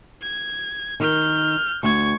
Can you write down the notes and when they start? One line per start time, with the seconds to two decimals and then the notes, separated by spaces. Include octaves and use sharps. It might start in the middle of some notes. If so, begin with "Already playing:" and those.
0.22 G#6
1.00 D#3 F6 G6
1.83 D2 C#6 G#6